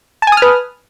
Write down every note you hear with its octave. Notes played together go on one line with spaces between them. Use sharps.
B4 G#5 A5 D#6 F6